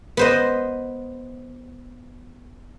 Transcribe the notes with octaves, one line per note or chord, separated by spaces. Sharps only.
B3 C5 D#5